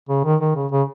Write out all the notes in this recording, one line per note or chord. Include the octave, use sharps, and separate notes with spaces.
C#3
D#3
D#3
C#3
C#3